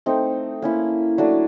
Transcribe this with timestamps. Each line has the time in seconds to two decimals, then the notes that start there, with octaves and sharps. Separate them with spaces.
0.06 A3 C4 D#4
0.62 A#3 C#4 E4
1.18 F#3 A3 D4